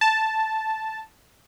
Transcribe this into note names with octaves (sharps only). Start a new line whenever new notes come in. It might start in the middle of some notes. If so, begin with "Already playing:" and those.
A5